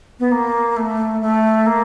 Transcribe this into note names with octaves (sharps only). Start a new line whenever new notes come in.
B3
A#3
A3
A3
A#3